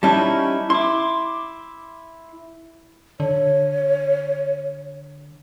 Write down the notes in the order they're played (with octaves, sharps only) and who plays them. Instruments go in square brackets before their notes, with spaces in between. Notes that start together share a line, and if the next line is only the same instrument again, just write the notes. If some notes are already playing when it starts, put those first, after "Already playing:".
[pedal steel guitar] G3 C#4 D#4 [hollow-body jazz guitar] E4 A5
[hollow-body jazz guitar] E4 [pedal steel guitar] C6 D6
[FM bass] D3 [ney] C#5